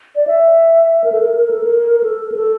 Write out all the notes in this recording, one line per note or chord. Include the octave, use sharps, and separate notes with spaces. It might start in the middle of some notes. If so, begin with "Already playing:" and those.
D5
E5
A#4
A4
A#4
A#4
A4
A#4
A#4
A4
A#4
A4